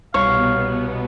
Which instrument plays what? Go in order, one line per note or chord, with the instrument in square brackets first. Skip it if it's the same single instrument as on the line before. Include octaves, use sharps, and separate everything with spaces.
[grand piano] C2 [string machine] B2 B3 [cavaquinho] C#5 [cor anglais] F5